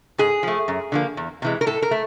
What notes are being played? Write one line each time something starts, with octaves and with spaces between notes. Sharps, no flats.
G#2 G#4
F3 A3
F#2
D3 F3 A#3
E2
C3 E3 G#3
A#4
A2 A4
A#4
A3